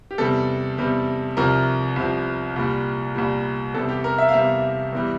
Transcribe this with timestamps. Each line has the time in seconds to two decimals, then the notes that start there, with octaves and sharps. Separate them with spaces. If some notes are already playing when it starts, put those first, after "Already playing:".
0.11 G4
0.18 E2 C3 G3 A4
0.78 E2 C3 G3
1.37 C2 C3 F3 A#4
1.96 C2 C3 F3
2.56 C2 A#2 G3
3.15 C2 A#2 G3
3.74 E2 C3 G3 A4
3.89 G4
4.04 A#4
4.18 E5
4.29 F5
4.34 E2 C3 G3 E5
4.92 E2 E3 G3